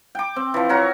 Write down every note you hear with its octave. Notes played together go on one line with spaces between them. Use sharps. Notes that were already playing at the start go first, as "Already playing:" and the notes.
G5 D6
C4
E3 F3
F#4 A#4 C#5